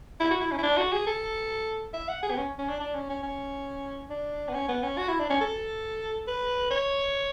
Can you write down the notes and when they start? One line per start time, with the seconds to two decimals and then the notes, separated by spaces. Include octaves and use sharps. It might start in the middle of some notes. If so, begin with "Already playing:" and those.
0.20 E4
0.31 F#4
0.41 E4
0.52 C#4
0.58 E4
0.63 D4
0.77 F#4
0.92 G#4
1.07 A4
1.93 E5
2.08 F#5
2.22 G#4
2.30 B3
2.37 C#4
2.58 C#4
2.69 D4
2.80 D4
2.95 C#4
3.09 C#4
3.23 C#4
4.10 D4
4.48 B3
4.54 C#4
4.68 B3
4.83 C#4
4.98 F#4
5.08 E4
5.19 D4
5.30 C#4
5.41 A4
6.27 B4
6.70 C#5